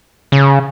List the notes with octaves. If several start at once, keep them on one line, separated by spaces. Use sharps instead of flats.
C#3